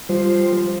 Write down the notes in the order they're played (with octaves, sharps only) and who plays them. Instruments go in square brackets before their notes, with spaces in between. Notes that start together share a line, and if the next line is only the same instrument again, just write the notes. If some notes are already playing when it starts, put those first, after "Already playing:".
[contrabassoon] F3 [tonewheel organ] G3 C5